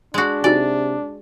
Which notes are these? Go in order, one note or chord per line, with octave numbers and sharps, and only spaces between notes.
G#3 D4 F#4
C3 D#4 F#4 D5 G#5